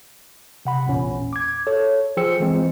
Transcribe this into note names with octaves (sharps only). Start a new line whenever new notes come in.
C3 F#5 B5
A1 E2 A#2 C#4
D6 G#6
A4 C#5
F3 G#4 C5 G5 E6 C#7
E3 F3 G#3 C4